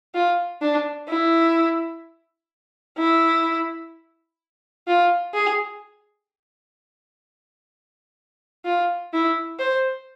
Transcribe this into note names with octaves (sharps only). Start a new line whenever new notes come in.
F4
D4
E4
E4
F4
G#4
F4
E4
C5